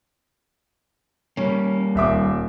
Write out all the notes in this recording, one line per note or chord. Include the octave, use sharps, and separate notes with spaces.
G3 A#3 C#4
D#1 E5 D6